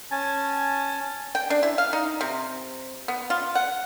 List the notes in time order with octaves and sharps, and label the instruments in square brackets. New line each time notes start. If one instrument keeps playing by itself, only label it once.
[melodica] C#4 G#5 A5
[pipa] G5
D4
E4
F5
D#4
C3
B3
F4
F#5